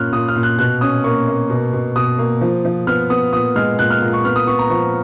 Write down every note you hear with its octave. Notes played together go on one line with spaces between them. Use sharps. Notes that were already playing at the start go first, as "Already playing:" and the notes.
Already playing: A#2 C#4 F6 F#6
A#2 D#6
F6
A#2
F#6
B2 F#6
C#4 D#6
A#3 C#6
A#3
B2
B2
B2 D#6
A#3
F3
F3
B3 F6
B3 D#6
A#2 D#6
G#3 F6
A#2 F#6
F6
A#2
C#6
B3 F6
D#6
B3 C#6
A#5
F3 C#6